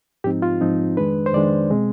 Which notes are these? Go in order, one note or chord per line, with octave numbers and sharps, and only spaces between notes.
G#2 F3 C4 D#4 G4
F4
G#2 F3 C4 D#4
F2 D#3 G#3 D4 B4
C5
F2 D#3 G#3 D4 D5
B2 G#3 C4